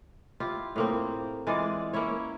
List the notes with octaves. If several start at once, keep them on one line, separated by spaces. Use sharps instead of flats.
E4 F4 G4
A2 A#3 C4
E3 G#3 F4 D5
A#3 C#4 E4 C#5